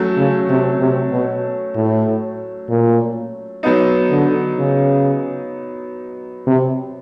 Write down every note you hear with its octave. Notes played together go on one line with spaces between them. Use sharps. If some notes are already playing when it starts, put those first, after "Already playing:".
Already playing: F#3 A3 C#4
C#3
C3
C3
B2
A2
A#2
F#3 B3 D#4
D3
C#3
C3